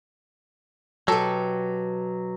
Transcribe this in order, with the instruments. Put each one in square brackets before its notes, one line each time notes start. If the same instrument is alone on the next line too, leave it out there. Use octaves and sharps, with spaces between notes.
[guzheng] B2 G4 [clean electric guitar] F#3 [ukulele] A4